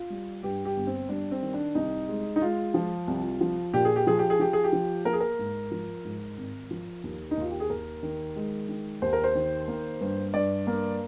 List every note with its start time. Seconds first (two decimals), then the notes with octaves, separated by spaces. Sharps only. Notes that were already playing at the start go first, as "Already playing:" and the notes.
Already playing: F4
0.10 G3
0.43 G2 G4
0.65 G4
0.76 G1
0.87 C4
1.09 G3 D4
1.31 C4
1.42 D#3
1.53 D4
1.75 C2 D#4
2.09 G#3
2.36 D#4
2.41 G#3 F4
2.74 F3
3.08 C2
3.41 F3
3.74 A#2 G4
3.85 G#4
3.96 G4
4.07 F3 G#4
4.19 G4
4.30 G#4
4.40 F3 G4
4.53 G#4
4.64 G4
4.73 F3
5.05 A#3 A#4
5.13 G#4
5.20 A#4
5.39 G#2
5.71 F3
6.05 G#2
6.38 G#1
6.71 F3
7.04 D#2
7.31 D#4
7.37 D#2 F4
7.50 G4
7.60 G#4
7.70 D#2 A#4
8.03 D#3
8.36 G#3
8.69 D#3
9.02 D#2 C5
9.13 A#4
9.24 C5
9.35 D#3
9.68 A#3
10.01 G2
10.34 G2 D5
10.67 A#3